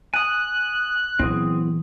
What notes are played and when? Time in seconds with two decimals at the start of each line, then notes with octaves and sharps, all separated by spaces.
0.14 G#5 D#6 F#6
1.20 A#2 E3 F#3 B3 C4 E4 G#4